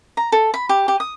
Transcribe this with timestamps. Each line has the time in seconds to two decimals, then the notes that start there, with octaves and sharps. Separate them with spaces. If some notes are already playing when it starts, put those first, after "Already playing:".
0.17 A#5
0.32 A4
0.54 B5
0.69 G4
0.88 G4
1.00 D#6